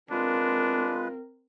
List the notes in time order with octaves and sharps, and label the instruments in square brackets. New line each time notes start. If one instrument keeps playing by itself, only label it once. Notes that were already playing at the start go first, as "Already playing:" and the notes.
[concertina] G#3 B4 [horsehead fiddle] C4 A#4 [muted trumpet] D4 [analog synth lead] F4